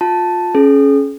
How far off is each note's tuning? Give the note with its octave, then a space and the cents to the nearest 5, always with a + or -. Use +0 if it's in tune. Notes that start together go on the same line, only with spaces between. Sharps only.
F4 +25 A5 +0
C#4 +0 G#4 +40